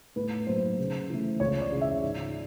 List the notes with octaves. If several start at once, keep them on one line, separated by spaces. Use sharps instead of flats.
A2 B4
F#3 A#3 C5
C#3
E3 A3
C#2 C#5
D5
C#3 E3
E5
G#2